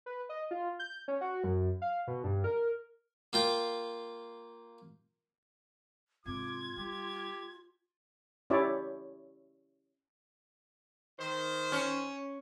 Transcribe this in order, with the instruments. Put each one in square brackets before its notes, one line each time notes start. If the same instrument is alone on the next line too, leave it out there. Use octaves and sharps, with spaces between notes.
[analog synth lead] B4
D#5
F4
G6
C#4
F#4
F#2
F5
B2
G2
A#4
[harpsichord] A#3 F4 G5
[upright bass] G#2 C3 [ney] F4 [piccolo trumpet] D6 [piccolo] G#6
[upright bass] G3 [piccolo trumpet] G4
[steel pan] C#4 E4 G4 C#5 D5 E5
[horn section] D#3 C5
[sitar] C#4